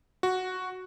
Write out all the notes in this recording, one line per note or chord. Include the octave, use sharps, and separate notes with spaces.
F#4